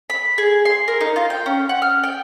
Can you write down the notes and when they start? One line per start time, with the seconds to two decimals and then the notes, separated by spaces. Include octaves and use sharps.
0.10 B5
0.38 G#4
0.65 C6
0.88 A#4
1.01 D#4
1.16 F4
1.30 G5
1.46 C#4
1.69 F#5
1.82 F6
2.03 G5